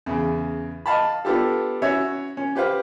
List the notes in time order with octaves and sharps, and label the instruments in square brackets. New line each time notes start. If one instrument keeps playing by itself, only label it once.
[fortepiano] E2 C#3
D#5 F5 A5 B5
B3 D4 F4 G4 A4
C#4 E4 F#4 C#5 E5
C#4
G4 B4 C5 F5